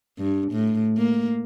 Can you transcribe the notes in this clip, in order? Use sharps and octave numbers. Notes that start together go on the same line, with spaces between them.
G2
A2
A#3